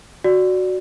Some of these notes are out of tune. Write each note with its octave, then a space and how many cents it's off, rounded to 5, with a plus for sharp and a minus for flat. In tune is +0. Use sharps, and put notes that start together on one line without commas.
F#4 +0 D5 +0